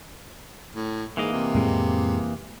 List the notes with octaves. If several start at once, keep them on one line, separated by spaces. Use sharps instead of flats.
A2
G#2 E3 A#3 D#5
C3
F2 A2 G#3